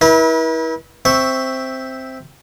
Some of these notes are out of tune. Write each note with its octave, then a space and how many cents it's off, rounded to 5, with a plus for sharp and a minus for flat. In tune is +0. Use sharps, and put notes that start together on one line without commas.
E4 -30 B4 -45
C4 +0 E5 +0 C#6 +0